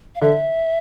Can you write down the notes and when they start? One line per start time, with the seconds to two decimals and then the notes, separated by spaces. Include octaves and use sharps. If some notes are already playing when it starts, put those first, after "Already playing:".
0.15 F5
0.21 D3 E5